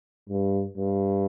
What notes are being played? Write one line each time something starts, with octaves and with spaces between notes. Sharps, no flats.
G2
G2